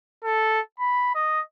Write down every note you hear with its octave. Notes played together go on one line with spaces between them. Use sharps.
A4
B5
D#5